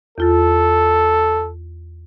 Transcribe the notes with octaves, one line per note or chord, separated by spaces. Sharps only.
E2 F4 A4 A6